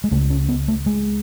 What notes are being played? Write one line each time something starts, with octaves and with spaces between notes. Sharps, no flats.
G#3
C#2 C#3 A3
C#4
B3
A3
G#3